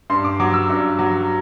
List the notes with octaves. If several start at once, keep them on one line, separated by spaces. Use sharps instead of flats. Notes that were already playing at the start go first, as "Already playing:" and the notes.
G2 C6
D6
F#3 D6
E6
G2
F#3